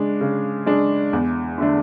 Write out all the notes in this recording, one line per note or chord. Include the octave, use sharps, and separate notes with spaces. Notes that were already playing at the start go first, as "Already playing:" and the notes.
Already playing: C#3 G#3 D4
C#3
G#3 D4
E2
D3 A3 D4